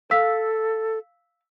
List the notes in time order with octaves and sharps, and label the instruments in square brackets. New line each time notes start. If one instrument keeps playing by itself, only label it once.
[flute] A4 [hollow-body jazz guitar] F5 [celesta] E6 B6